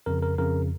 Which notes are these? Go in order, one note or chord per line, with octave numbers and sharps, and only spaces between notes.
F2 C#3 A#4
A#4
F2 C#3 A#4